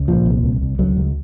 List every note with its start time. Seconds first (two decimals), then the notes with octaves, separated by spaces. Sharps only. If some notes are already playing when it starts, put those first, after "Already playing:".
Already playing: C#2
0.08 A#2 F3
0.26 C2
0.43 C2
0.61 C2
0.79 C#2 F#3
0.97 C#2